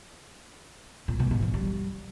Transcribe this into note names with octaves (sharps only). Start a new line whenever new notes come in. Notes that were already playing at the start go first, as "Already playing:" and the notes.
A#2
B2
G#2
F3
G3